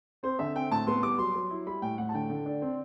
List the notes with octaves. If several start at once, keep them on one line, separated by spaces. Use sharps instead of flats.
C4 C5
D3 E5
C4 G5
A2 A5
B3 C6
G3 D6
F#3 C6
F#3
E4
G3 B5
A2 G5
A2 F#5
A5
D3 G5
D3
D4
C4